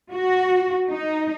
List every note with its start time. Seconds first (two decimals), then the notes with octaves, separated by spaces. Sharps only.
0.13 F#4
0.89 D#4